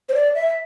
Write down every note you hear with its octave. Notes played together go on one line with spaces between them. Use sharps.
C5
D5
E5